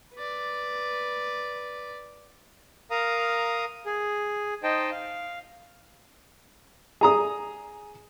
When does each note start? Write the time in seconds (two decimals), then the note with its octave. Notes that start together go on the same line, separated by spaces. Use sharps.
0.14 B4 D5
2.91 A#4 F5 A#5 D#6
3.86 G#4
4.63 D#4 C5 D#5 G5 A5
4.91 F5
7.01 G#4 A#5 D#6